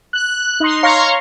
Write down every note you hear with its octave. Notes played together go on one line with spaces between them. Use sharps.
F#6
D#4 C6
C#5 F5 A#5 C6 C#6